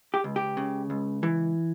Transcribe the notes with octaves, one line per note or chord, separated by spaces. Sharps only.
G4
C#2
G4
C#3
C#2
E3